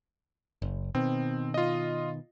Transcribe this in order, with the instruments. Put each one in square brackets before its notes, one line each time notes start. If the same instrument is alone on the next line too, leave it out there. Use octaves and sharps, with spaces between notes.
[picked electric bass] F#1
[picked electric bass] B2 D#3 [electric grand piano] C4
[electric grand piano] F4 D#5